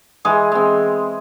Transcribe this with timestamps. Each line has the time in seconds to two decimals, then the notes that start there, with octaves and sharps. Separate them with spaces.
0.25 E3 G#3 G#4
0.52 G#3 C4